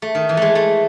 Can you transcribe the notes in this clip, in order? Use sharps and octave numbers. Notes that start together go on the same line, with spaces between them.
A3
D#3
E3
G#3 A3
A3